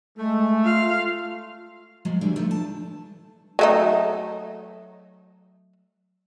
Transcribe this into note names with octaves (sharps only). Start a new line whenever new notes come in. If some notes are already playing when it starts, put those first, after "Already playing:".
G#3 A3
F4 F5
F3 F#3 G#3
D3 E3 F3 G3
G2 D#3 F3 A3 D4
A5
F#3 A3 D#4